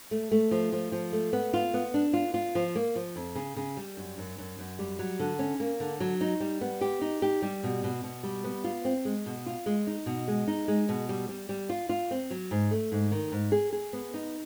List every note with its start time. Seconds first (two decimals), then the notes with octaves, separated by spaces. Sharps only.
0.11 A3
0.32 A3
0.51 F3
0.72 F3
0.92 F3
1.13 A3
1.33 B3
1.53 F4
1.74 B3
1.94 D4
2.14 F4
2.34 F4
2.55 F3
2.75 A#3
2.96 F3
3.16 F2
3.35 C#3
3.56 C#3
3.77 G3
3.97 F#2
4.18 F#2
4.38 F#2
4.59 F#2
4.79 G3
4.99 F#3
5.19 D3
5.39 C#4
5.60 A#3
5.80 D3
6.00 F#3
6.21 D#4
6.40 G3
6.61 B3
6.81 G4
7.01 D#4
7.22 G4
7.42 G3
7.64 B2
7.84 B2
8.04 B2
8.23 G3
8.44 B3
8.64 F4
8.85 C4
9.05 G#3
9.26 B2
9.46 F4
9.66 G#3
9.87 D#4
10.06 B2
10.28 G#3
10.47 D#4
10.68 G#3
10.89 B2
11.09 G3
11.29 G3
11.49 G3
11.69 F4
11.89 F4
12.11 C4
12.31 F#3
12.51 G#2
12.71 A3
12.92 G#2
13.11 D#3
13.32 G#2
13.52 G#4
13.73 G#4
13.93 B3
14.14 D#4